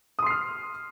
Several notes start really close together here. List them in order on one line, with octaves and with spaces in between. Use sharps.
D#6 C6 C7 F6